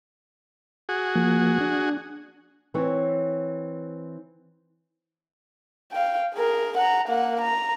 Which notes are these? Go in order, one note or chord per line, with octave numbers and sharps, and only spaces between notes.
F#4 G#4
F3 A#3
D4
E3 C4 E4 B4 C#5
F5 G5
G#4 A#4
F#5 A#5
A#3 F#5
A#5